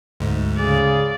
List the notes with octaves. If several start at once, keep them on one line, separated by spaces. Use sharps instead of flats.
D2 G#2
C#3 G#4 D5